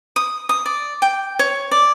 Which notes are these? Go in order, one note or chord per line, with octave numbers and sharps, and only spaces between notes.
D#6
D#6
D5
G5
C#5
D5